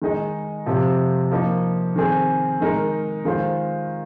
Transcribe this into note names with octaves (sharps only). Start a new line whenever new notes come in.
D#3 G#3 D#4 G#4 D#5
C3 F3 C4
F3 A#3 D#4
D#3 C4 G#4
D#3 G#3 D#4 A#4
D#3 G#3 F4 C5